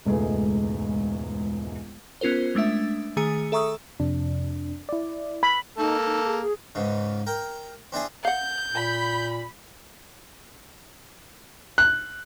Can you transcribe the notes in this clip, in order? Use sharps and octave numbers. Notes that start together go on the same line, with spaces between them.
E1 C#2 G#2 A3 G#4 B4
B3 C#4 F4 A#4 C5
G#3 A3 D4 E5
D#3 A3 G#4 G#5 C#7
A4 E5 A#5 C#6 D#6 E6
F2 C3 D4
E4 D5
B5
A#3 D#4 A4
D#4
G#4
G#4
C#2 G#2 C#3
A#4 G5
C4 D4 E4 G#4
F5 F#5 G6
A#2 B5
F#6